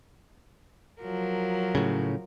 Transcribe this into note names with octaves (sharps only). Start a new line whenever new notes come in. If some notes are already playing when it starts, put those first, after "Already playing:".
F3 F#3 A#4
A2 C#3